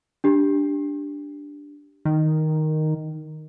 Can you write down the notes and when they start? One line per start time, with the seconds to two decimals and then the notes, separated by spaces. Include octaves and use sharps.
0.24 D4 G4
2.05 D#3